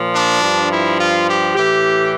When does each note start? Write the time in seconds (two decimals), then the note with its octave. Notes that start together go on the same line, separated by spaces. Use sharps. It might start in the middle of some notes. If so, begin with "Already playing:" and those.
Already playing: A#2 F3
0.12 D4
0.40 G2 F3
0.68 E4
0.97 F4
1.25 G4
1.54 A2 E3 G4